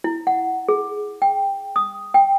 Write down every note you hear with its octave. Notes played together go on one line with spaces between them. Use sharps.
E4
F#5
G#4
G5
D#6
G5